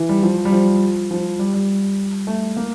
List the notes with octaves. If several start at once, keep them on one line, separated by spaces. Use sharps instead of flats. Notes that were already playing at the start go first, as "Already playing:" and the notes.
Already playing: E3
G3
F3
G3
F3
F3
G3
G3
A3
A#3